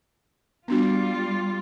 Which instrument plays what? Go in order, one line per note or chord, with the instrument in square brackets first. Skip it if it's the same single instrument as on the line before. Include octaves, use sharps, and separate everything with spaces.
[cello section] G3 F4 [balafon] B3 D4 F#4